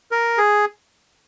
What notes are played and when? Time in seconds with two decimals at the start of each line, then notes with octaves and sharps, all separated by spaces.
0.11 A#4
0.38 G#4